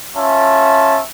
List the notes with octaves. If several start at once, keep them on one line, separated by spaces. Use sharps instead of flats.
C#4 F4 E5 A5